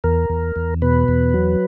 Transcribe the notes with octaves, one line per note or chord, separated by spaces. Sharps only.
E2 A#4
E2
E2
B2 B4
E2
F#3